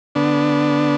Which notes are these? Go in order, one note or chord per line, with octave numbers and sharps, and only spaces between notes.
D3 B3 D4